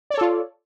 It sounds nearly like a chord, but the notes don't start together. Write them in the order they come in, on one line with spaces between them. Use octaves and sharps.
D5 C#5 A4 F4